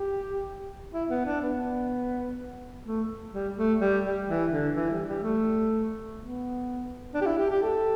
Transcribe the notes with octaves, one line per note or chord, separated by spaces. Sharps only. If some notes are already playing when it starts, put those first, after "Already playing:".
Already playing: G4
E4
B3
D4
B3
A3
G3
A3
G3
G3
E3
D3
E3
G3
G3
A3
B3
D4
G4
E4
G4
G4
A4